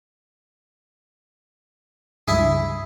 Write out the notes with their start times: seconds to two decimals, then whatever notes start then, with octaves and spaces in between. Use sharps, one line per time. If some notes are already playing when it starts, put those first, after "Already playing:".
2.28 C#2 G2 E4 G#4